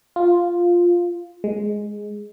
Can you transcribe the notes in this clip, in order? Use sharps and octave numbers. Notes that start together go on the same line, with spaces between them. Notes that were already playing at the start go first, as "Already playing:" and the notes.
F4
G#3